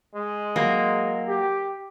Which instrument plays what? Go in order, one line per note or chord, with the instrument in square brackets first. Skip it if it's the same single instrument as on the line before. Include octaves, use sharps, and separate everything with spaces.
[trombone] G#3
[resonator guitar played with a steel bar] F#3 A#3
[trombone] G4